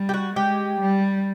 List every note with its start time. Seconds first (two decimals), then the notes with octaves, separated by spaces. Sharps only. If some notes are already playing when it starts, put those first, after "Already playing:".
Already playing: G3
0.09 G4
0.14 F#4
0.36 G#3 G4
0.81 G3